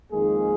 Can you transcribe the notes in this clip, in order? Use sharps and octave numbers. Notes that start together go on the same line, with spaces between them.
F2 D#3 G#3 A#3 G#4